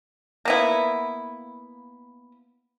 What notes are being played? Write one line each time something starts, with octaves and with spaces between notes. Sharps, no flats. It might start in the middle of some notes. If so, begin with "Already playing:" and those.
A#3 B3 E4